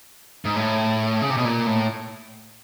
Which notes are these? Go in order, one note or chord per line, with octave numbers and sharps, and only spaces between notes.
G#2
A2
C#3
C3
B2
A#2
A2